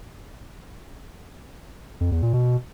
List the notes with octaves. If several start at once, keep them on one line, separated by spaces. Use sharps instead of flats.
F2
E2
A#2
B2